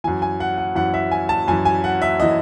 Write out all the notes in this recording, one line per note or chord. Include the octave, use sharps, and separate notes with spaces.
F#2 E3 G#5
G#5
F#5
F#5
F#2 E3 F#5
E5
G#5
A5
F#2 E3 G#5
G#5
F#5
E5
E3 D#5